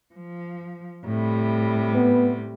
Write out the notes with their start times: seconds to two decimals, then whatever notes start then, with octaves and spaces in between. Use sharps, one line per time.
0.15 F3
1.06 A2 C3 G3
1.95 B3